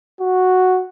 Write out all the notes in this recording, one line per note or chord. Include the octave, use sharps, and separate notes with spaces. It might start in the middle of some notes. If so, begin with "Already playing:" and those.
F#4